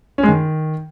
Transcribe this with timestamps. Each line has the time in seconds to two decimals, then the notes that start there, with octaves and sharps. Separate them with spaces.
0.18 C#4
0.23 G#3
0.29 D#3